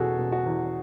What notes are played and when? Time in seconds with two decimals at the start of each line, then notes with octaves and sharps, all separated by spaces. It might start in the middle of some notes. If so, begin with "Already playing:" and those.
Already playing: E2 B2 F#4 G#4 A4
0.19 B2
0.32 F#4
0.46 E2